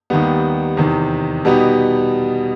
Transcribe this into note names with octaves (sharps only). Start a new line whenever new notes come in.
D#2 D#3 G3 B3
E2 C3 D#3
B2 G3 B3 D#4 G4